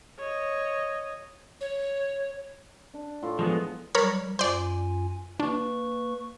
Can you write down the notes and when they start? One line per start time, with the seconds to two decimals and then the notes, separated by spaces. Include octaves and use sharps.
0.19 C#5 D#5
1.61 C#5
2.94 D4
3.22 A2 F4 C6
3.39 F3 G#3 B3 G#4
3.95 F#3 G3 A#4 C#5 B5
4.39 F#2 F4 C5 D5 G#5
5.40 A#3 D4 B4 C#6